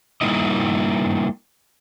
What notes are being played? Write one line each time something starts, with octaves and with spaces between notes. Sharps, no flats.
G3 A#3 D#4 E4 D#5